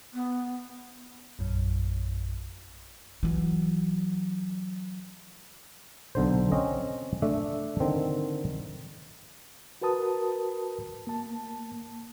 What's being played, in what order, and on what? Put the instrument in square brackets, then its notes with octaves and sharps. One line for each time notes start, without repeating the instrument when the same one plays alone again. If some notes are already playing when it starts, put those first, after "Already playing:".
[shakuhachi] B3
[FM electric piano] A#1 F#2
[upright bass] E3 F#3
[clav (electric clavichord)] B1 D3 C5
C4 C#4 D#5
A3 D4 E5
D3 D#3 C4
[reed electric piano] F#4 A#4 B4 A5 D#6
A#3 A5